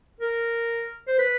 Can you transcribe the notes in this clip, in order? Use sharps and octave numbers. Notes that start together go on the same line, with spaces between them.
A#4
C5
B4